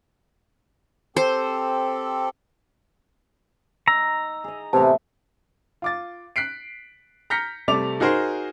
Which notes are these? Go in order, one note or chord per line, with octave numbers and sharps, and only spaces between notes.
C4 G4 A4 C5
D#4 A#5 E6
G#4 D#5
A2 C3 E3 B3 A5
F4 D6 A6
F#6 B6 C7 D7
A#5 F6 G6 A#6 B6 C#7
C3 G3 A3 D5 D6 F7
D#4 F#4 G#4 A#4 C5